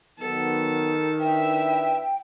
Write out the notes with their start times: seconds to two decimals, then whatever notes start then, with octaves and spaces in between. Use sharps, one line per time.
0.19 D#3 F#3 B3 A4
1.20 D4 E4 B4 E5 G5